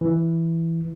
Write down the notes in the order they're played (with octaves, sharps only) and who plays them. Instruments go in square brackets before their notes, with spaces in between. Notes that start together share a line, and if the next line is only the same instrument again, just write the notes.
[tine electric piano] E3